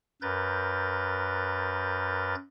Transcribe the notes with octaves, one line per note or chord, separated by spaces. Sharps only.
F#2 A#4 B4 G6 A6